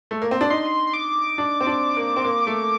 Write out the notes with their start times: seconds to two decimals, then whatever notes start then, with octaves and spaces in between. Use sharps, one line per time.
0.11 A3
0.22 A#3
0.31 C4
0.41 D4
0.50 D#4 C6
0.87 C6
0.94 D6
1.38 D4
1.61 C4
1.67 D4
1.97 A#3
2.17 C4
2.25 A#3
2.47 A3